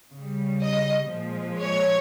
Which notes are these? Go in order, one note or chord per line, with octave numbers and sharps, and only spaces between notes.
C#3 G3
D#5
A#2 F3 G#3
C#5